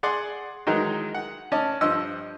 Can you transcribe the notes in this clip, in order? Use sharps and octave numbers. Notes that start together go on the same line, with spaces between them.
G#4 D5 F#5 C6 D6
D#3 E3 F#3 G#3 D#4 F#4
F#5
C#4 D5 D#5 A5
G2 F3 C5 D#5 E6